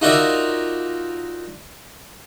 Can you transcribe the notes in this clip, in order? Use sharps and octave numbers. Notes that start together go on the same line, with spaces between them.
D#4 F4 F#4 A#4 D5 E5